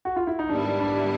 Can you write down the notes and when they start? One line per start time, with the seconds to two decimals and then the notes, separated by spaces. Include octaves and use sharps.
0.05 F#4
0.16 F4
0.27 E4
0.39 D#4
0.49 G#2 D#3 G3 B3 D4 E4
0.80 D4